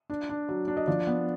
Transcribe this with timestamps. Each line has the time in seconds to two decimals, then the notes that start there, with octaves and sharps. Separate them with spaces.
0.10 D4
0.29 D4
0.49 F#3
0.68 D4
0.77 D#5
0.87 F3 D5
1.07 B3